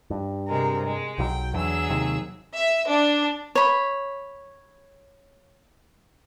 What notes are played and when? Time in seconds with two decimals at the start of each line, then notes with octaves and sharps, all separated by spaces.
0.10 G2
0.48 C3 G#3 A#4
0.85 G#3
1.18 B1 E3 F#3 G5
1.54 E2 D3 F#3 G#4 E6
1.90 D#2 C3 D#3
2.55 E5
2.88 D4
3.55 C#5 B5